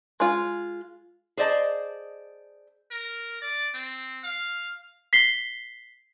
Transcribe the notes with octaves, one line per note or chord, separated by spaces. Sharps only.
G#3 F4
G#4 C5 D5 D#5 A5
A#4
D5
C4
F5
B6 C7 G7